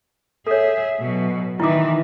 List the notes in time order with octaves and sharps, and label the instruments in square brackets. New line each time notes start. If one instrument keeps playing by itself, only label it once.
[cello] G#4 E5 [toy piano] A4 C#5
[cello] B2 F#3
[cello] D#3 E3 [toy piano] E4 D6